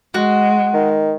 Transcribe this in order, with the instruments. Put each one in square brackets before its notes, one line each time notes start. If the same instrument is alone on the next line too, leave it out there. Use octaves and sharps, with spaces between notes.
[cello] G#3 [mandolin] F#4
[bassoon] D#3